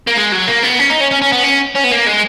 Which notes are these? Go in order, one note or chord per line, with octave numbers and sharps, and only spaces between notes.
A#3
G#3
F#3
A#3
B3
C#4
D#4
C#4
C#4
C#4
B3
C#4
C#4
B3
A#3
G#3